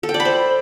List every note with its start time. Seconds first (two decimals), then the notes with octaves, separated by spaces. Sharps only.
0.03 A4
0.09 G5
0.14 D5
0.20 B5
0.25 C5